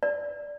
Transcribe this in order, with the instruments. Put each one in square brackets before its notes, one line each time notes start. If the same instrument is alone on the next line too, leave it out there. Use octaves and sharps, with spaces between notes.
[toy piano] D5